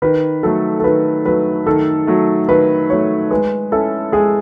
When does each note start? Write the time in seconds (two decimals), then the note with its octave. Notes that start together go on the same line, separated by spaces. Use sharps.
0.02 D#3 B4
0.43 F#3 A3 A4
0.79 A4
0.84 D#3 B4
1.26 F#3 A3 B4
1.66 D#3 A4
2.07 F#3 A3
2.48 D#3 B4
2.90 F#3 A3 C#5
3.31 G#3 B4
3.72 C#4 E4 A4
4.12 G#3 G#4